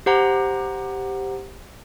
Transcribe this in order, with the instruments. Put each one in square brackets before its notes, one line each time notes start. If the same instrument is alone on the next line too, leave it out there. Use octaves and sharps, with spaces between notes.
[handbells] G4 C5 F#5 A#5